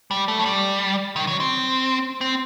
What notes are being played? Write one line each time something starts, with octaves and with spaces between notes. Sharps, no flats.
G3
A3
F#3
G3
D#3
F#3
C4
C4